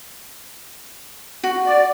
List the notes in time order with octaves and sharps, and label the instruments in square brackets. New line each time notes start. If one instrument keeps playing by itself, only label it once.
[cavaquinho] F#4
[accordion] D5